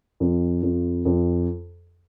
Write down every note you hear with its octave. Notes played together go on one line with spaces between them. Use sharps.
F2
F2
F2